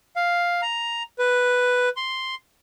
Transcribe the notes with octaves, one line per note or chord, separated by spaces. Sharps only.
F5
A#5
B4
C6